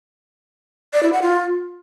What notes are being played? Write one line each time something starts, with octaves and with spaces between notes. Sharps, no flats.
D5
E4
F#5
F4